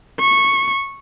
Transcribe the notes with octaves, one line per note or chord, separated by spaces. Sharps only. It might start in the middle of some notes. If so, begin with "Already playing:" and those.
C#6